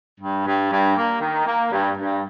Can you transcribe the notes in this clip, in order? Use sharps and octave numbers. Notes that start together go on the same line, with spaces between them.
G2
G2
G2
A#3
D#3
A#3
G2
G2